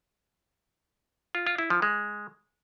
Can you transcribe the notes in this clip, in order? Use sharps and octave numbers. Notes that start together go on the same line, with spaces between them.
F4
F4
E4
F3
G#3